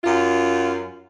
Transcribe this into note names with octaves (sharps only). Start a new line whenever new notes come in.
F#2 F4